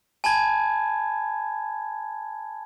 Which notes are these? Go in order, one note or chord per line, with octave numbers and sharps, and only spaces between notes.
G#5 A5 B5 G#6